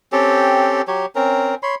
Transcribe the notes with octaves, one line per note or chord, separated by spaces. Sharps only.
C4 C#4 G4 A4
F#3 G4 C#5
C4 C#4 A#4
C#5 B5 C6